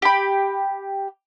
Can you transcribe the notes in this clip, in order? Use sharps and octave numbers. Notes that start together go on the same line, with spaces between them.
G4 B5